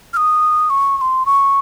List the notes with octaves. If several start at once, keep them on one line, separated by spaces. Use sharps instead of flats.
F6
D#6
C#6
C#6
C6
C#6